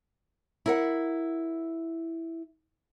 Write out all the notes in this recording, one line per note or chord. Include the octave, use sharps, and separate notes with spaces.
E4 A#4 F#5